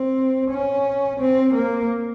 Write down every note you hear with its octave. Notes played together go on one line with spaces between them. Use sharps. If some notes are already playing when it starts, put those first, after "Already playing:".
Already playing: C4
C#4
C4
A#3